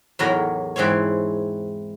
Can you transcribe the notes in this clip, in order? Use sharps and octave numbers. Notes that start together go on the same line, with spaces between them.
E2 A2 D#3 F#3 A#4 A#5
G#2 E3 C4 C5 C#5